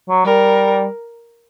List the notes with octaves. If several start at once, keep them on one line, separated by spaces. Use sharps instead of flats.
F#3
G3 A#4